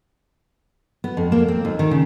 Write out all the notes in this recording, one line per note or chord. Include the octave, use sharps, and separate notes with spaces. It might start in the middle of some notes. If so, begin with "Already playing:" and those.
B3
F2
A#3
C4
D#2
D#3
C#3